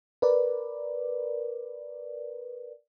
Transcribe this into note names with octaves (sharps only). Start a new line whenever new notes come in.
A#4 B4 D5